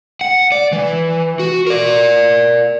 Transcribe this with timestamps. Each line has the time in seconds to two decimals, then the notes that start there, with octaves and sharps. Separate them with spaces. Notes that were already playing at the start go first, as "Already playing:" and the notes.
0.21 F#5
0.52 D5
0.73 E3
1.39 F#4
1.67 A#4 D5